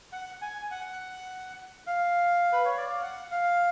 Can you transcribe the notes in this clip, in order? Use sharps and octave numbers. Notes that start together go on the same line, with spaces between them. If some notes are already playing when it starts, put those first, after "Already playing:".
F#5
G#5
F#5
F5
B4
C#5
D5
F5
F#5
F5